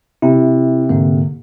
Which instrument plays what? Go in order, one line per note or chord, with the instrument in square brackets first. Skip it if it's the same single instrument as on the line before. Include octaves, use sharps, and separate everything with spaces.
[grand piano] C3 [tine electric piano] E4
[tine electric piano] G#2 D3 A#3